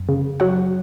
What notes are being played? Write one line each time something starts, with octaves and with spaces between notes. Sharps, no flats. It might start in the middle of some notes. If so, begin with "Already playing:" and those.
Already playing: F#2
C#3
F#3 F#4 F#5